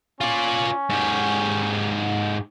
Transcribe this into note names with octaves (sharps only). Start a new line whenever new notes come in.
C#4 F4 D5
G#2 G4